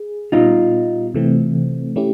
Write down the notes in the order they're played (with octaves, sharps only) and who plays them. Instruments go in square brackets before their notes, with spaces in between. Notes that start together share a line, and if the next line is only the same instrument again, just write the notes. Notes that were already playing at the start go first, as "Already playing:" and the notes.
Already playing: [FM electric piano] G#4
[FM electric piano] A#2 G3 B3 [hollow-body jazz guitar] D#4 F4
[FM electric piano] C3 E3 A3 C4
A3 C#4 E4 G4